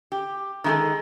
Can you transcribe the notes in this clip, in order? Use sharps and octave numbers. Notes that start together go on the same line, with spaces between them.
G4
D#3 G#3 E4 G#4 A4